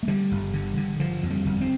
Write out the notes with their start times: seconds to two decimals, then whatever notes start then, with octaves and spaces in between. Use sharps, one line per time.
0.03 A3
0.08 D3 G3
0.31 G1
0.54 D3
0.77 D3
1.00 D3 F3
1.23 F2
1.30 G3
1.46 G1
1.61 C4